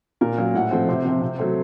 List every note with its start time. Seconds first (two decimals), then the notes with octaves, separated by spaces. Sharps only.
0.21 A#2 A#4
0.38 F#3 A#3 C#4
0.54 A2 F#5
0.71 F3 A3 C4
0.89 C3 C5
1.05 F3 C4
1.21 C3
1.39 F#3 A3 C4